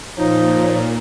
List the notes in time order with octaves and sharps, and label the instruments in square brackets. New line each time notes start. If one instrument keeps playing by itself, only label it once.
[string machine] A#2 [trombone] F3 [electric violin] D#4 [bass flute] C#5